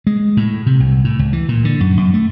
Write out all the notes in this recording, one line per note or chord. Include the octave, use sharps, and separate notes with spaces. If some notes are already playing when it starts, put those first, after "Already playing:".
G#3
A2
C3
C2
A2
C#2
E3
A#2
D3
F#2
F#2
A3